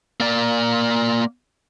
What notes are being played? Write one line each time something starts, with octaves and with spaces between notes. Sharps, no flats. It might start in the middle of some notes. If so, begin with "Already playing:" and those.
A#3 D5